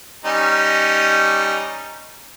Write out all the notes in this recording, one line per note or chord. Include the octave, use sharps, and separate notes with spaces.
G3 C#4 D#4